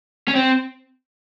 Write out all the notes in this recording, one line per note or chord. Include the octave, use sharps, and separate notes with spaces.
C#4
C4